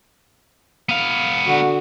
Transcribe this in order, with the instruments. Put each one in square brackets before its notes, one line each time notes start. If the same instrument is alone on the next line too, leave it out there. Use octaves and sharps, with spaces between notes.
[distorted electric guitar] B3 F5
[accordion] D3 F#4